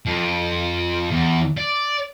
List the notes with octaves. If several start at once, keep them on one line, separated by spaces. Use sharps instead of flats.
F2
E2
D5